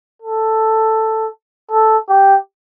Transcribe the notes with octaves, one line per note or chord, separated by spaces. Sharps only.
A4
A4
G4